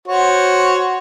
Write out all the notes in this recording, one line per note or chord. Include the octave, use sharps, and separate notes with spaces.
F#4 C5 C#5